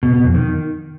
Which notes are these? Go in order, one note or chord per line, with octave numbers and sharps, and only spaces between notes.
B2
B2
F2
D#3